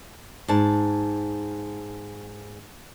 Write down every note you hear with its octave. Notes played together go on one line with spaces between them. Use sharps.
G#2 A5